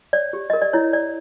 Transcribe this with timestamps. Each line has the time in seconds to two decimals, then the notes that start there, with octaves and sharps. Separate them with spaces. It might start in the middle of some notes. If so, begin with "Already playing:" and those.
0.13 C#5 D5
0.33 G4
0.50 A#4 D#5
0.62 D5
0.73 E4 C#5
0.93 C#5 D5